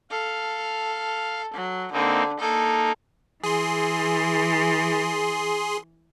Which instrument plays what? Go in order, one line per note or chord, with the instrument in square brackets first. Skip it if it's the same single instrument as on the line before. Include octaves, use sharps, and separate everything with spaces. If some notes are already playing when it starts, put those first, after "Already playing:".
[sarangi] A4 [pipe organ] F5
[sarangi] F#3
[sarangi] D3 [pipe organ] A#3 C4 D#4
[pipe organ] A#3 D#4 [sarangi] A4
[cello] E3 [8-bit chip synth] G#4 C6